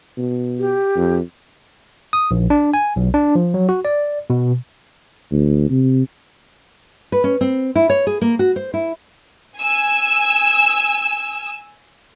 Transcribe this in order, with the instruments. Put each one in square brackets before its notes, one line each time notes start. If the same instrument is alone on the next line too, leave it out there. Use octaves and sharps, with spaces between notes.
[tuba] B2
[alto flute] G4
[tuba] F2
[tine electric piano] D#6
A#1
D4
G#5
B1
D4
F3
F#3
F#4
D5
B2
[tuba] D2
C3
[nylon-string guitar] B4
C#4
C4
E4
C#5
G#4
A#3
F#4
C5
E4
[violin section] G#5 E6